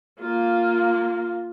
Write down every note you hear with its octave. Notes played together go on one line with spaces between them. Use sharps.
A#3 F4